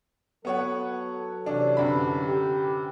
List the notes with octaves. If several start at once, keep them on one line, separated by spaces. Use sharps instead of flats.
F#3 B3 A4 C#5 F#5
C3 E3 C#4 D4
F#2 D3 B5
G4